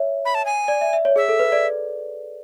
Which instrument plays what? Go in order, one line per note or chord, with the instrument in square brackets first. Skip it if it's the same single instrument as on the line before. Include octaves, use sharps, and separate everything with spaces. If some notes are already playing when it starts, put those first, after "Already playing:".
Already playing: [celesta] C#5 E5
[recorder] B5
A5
G#5
[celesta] D5
E5
E5
C#5
[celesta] G#4 [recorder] E5
[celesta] A4
B4
D5